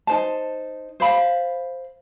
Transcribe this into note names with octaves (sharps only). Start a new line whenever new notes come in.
D#4 C5 A5
C5 F5 B5